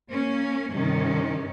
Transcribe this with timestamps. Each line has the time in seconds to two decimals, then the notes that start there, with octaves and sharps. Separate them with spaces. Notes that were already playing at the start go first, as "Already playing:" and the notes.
0.13 A#3 C#4
0.69 G2 C3 D#3 C#4